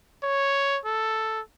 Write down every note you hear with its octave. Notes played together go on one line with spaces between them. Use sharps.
C#5
A4